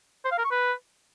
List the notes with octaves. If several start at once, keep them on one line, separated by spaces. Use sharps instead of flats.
C5
F5
A#4
C#6
B4